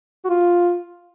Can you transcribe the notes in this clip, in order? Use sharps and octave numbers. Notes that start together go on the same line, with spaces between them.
F#4
F4